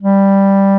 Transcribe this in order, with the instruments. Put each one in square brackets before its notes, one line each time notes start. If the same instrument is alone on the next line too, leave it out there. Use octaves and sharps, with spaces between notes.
[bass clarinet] G3